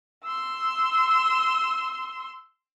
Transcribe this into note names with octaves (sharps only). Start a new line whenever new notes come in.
C6 E6